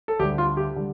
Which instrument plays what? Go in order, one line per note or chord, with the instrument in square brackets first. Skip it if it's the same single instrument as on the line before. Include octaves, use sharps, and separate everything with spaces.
[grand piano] A4
D2 D3 G3 G4
F4
G4
D3 G3